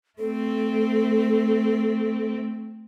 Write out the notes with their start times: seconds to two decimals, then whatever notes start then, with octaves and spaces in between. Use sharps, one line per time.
0.19 A3 C4 A4